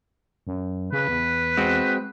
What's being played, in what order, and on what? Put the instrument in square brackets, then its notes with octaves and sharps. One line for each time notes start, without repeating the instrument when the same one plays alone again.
[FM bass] F#2
[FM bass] C#3 [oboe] B4
[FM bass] E2
[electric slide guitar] G#3 C4 F#4